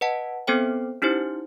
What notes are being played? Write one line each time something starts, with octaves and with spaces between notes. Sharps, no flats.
B4 D#5 F#5 A5
B3 C4 A4 C5 G5
C#4 D#4 E4 G4 C5